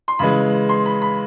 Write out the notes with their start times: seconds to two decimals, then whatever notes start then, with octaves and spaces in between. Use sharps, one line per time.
0.08 C6
0.19 C#3 E3 G#3 B5
0.69 C6
0.86 B5
1.02 B5